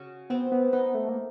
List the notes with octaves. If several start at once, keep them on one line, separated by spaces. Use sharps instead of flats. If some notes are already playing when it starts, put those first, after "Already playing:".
Already playing: C#3 F#4
B3 C4
B3
B3 D#4
A3
A#3